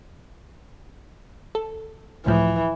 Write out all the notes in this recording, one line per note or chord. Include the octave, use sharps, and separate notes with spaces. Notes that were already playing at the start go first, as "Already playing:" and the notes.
A4
C#2 A2 E3 F3